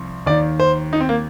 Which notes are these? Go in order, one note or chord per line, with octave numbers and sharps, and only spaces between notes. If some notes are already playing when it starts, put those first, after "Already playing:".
Already playing: C2 F3
D#2 D#3 D5
C5
D#4
C4
A#3